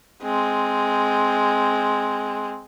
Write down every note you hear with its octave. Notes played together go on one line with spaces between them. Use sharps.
G#3 C4